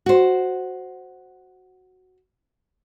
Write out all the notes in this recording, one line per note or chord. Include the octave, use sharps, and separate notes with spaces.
F#4 C5